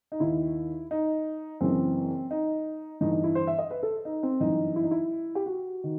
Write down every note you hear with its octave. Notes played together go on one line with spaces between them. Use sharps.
D#4
D#2 D#3 E4
D#4
F#1 F#2 E3 C4
D#4
G1 G2 E3 D#4
D#4
E4
C5
E5
D#5
B4
A4
D#4
C4
G1 F#2 E3 D#4
E4
D#4
E4
G4
F#4
D#3